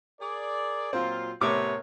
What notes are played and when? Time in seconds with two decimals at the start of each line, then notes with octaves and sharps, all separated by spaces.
0.20 G#4 A#4 D5
0.93 A#2 F#3 C4 F4
1.41 A2 C3 B3 A#4 C#5 D6